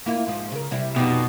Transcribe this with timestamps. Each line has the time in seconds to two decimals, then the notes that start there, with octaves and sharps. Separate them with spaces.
0.06 A#3 E4 F4
0.27 G#2 F3
0.52 C#3 A#4
0.71 C3 G3 E4
0.96 F2 B2 D#4 G4